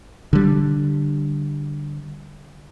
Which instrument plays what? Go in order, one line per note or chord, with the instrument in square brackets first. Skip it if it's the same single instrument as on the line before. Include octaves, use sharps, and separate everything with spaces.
[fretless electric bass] D3 G3